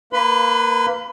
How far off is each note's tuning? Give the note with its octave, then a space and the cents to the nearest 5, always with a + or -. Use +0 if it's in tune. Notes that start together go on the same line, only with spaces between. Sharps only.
A#3 -5 B4 +0 B5 +45